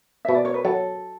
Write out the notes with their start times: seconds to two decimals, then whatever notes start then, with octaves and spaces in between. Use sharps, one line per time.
0.25 B2 E5
0.34 D5
0.45 C#5
0.54 B4
0.65 F#3 A4